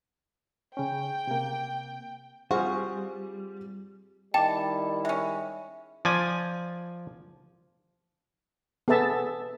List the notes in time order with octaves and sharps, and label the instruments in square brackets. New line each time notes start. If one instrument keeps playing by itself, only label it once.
[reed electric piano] C#3 C#4 [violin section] G5
[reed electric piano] C3 A#3
[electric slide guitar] G3 [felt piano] C4 F4 [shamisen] F#4 [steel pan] G#4 C5 F5
[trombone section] D#3 G3 E4 [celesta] D#5 D6 [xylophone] G5 [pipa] A5
[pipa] G#3 C#4 [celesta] E5
[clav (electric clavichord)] F3 D5 G#5
[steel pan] B3 G#4 A4 E5 A5